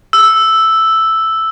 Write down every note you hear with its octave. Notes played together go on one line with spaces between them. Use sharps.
E6